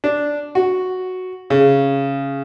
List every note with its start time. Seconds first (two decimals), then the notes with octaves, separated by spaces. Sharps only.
0.04 D4
0.55 F#4
1.50 C#3